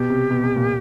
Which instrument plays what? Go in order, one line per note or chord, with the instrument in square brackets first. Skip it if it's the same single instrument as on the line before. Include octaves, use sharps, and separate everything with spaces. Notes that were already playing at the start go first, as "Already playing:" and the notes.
Already playing: [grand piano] B2 [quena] G4
[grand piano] C3
B2
B2
A#2